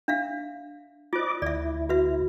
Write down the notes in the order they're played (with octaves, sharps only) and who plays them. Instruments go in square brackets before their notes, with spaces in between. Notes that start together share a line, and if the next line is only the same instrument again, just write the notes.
[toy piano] D4 E5 F5
[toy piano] F4 C5 [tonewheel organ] D5 D#5 D6
[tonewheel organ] D2 E4 [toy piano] D5 E5
[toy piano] F#4 B4 E5